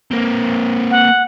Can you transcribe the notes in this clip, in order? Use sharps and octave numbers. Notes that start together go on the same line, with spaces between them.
A#3 C4
F#5